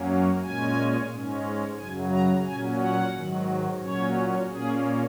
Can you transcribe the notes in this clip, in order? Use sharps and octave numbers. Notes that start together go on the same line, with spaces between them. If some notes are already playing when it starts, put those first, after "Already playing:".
Already playing: F#2 F#3 A#3 C#4
A#2 G#3 C#4 G#5
G#2 G#3 C#4
F#2 C#3 F#3 G#5
A#5
A#2 F#3 C#4 G#5
F#5
G#2 D#3 F#3
A#2 F#3 C#4 C#5
A#2 A#3 C#4 G#4